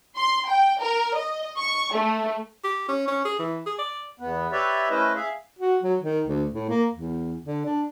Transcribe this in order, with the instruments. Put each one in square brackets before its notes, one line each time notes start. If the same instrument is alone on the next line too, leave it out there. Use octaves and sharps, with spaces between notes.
[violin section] C6
G5
A#4
D#5
C#6
A3
[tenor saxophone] G4
C#4
C#4
G#4
E3
G#4
D5
[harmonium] E2 B3
G4 B4 C#5 D5 E5
A3 C#4 E4 B4 C5 D#5
G#4 E5 F5
[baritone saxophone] F#4
F#3
D#3
D2
A2
A#3
E2
D3
D4